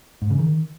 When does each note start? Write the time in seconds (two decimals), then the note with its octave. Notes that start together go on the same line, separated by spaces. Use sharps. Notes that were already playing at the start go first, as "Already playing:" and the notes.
0.22 G#2
0.30 C#3
0.39 D#3